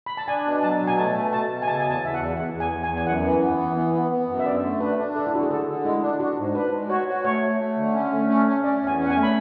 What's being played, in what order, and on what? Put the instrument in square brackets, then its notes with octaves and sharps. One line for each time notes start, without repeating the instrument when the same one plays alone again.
[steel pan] B5
A5
[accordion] D4 [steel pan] G#5
[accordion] B2
[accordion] F#3 [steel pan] A5
[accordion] B2
[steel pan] G#5
[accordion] A3 [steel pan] A5
[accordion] B2
[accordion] B2 [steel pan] A5
[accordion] B2
[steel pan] G#5
[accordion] C#3 [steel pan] A5
[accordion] E2 [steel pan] G#5
[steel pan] A5
[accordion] E2 [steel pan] E5
[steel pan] F#5
[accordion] E2
[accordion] E2 [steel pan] F#5
[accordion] E2
[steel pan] G#5
[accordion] E2
[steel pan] G#5
[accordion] E2
[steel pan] G#5
[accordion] F#2 [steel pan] F#5
[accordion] E3
B3
E3
B3
B3
B3
F#2
[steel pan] E5
[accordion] D3 [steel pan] D5
[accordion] A3
[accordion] D4 [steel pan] B4
[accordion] D4
[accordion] D3 [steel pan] A4
[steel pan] E4
[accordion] D3 [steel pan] F#4
[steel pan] G#4
[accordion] D3 [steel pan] A4
[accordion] D3
[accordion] G#3 [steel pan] E4
[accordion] D4
[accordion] D4 [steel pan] F#4
[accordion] G#2
[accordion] D4 [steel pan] B4
[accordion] G#3
[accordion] F#4 [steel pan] C#5
[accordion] F#4
[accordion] A3 [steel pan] C#5
[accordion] A3
A3
D3
C#4
A3
C#4
C#4
[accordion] C#4 [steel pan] D5
[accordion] E2
[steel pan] G#5
[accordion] C#4
[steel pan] F#5
G#5
[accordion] A3
[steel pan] B5